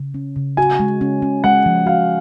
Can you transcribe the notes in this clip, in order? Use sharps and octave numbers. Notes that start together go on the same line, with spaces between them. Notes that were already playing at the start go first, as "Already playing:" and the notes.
Already playing: C#3
C#4
C#3
F#4 G#5
G#3
C#4
C#4
G#3 F#5
F3
F#4 F5